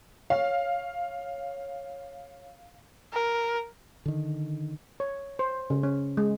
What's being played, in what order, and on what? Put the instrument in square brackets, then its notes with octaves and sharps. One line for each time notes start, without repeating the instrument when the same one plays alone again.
[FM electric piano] C#5 [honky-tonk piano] F5
[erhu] A#4
[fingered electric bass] D3 D#3
[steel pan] C#5
C5
C#3
C#4
G#3